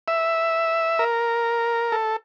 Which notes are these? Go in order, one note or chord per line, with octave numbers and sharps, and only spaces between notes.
E5
A#4
A4